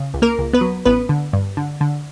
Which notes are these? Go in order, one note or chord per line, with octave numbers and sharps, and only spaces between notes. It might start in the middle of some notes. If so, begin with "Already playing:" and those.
Already playing: C#3
C#2
A#3 A#4
C#2
B3 B4
F#3
A1 B3 B4
D3
G2
D3
D3